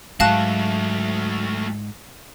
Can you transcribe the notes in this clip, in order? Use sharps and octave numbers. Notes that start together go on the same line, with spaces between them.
G#2 F#3 A3 F#4 F5 A5 F#6